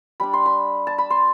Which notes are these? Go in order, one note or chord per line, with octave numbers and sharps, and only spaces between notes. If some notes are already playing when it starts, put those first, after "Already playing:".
G3 D4 B5
C6
B5
A5
B5
C6